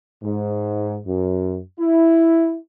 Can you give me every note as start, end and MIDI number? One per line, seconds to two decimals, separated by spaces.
0.23 0.98 44
1.07 1.61 42
1.80 2.57 64